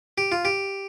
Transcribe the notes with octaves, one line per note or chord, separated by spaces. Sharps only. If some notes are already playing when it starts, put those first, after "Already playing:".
G4
F4
G4